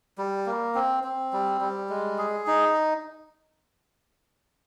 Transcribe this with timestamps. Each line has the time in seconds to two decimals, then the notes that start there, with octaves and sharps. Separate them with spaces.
0.18 G3
0.46 A#3
0.75 C4
1.04 C4
1.33 G3
1.61 G3
1.89 G#3
2.18 G#4
2.47 D#4